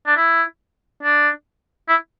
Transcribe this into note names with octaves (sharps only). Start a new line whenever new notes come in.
D4
E4
D4
E4